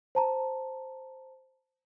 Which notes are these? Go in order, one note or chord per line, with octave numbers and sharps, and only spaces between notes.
C5 A5 A#5